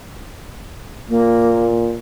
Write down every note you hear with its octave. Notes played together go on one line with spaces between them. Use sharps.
A#2 A#3